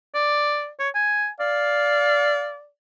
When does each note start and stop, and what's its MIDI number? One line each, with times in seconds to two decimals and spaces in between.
0.15 0.70 74
0.79 0.89 73
0.94 1.29 80
1.40 2.69 74
1.40 2.55 77